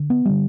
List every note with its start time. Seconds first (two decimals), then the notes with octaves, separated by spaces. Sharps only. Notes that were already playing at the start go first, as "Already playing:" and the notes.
Already playing: D3
0.10 B3
0.25 D3 G3